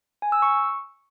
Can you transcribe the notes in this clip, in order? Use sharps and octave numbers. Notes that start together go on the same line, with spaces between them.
G#5
E6
C#6